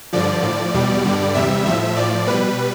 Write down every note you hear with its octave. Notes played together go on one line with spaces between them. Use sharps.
G2 D3 F3 D5
A2 F3
E2 B2 G3
G2 D3 G3
E2 C3 G3 E5
A2 F3 E5
A2 F3 D5
B2 G3 B4